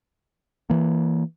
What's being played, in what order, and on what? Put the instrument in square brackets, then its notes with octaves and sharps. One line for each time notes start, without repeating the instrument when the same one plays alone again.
[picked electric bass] E3 A#3